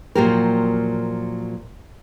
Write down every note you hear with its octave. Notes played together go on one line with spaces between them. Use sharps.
A#2 F3 F#3 A#3 G4 A#4